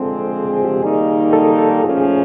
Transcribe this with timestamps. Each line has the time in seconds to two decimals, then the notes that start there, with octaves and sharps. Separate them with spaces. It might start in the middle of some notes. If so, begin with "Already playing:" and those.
Already playing: D3 F3 G#3 C4 A4
0.31 G#4
0.49 G#4
0.65 G4
0.82 D#3 G3 A#3 D#4 G#4
1.33 A4
1.58 A4
1.84 A#2 F3 A3 C#4 G#4
2.00 G#4